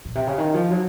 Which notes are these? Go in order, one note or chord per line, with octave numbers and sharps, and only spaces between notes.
A#2
C3
C#3
D#3
F3
F#3